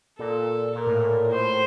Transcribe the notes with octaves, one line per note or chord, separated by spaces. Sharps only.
A#2 A4
A#2 A#4
A2
A#2
A2 C5